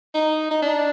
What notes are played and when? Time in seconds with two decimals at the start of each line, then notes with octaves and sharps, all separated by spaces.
0.14 D#4
0.51 D#4
0.62 D4